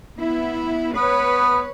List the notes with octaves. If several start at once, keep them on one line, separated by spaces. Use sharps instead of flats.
B3 E4
B3 B4 C#5